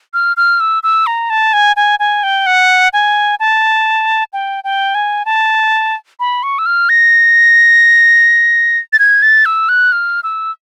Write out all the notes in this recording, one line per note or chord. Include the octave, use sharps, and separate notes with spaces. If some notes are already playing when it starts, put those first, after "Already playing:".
F6
F6
E6
E6
A#5
A5
G#5
G#5
G#5
G5
F#5
G#5
A5
G5
G5
G#5
A5
B5
C#6
E6
F6
A#6
A6
G#6
A6
E6
F#6
F6
E6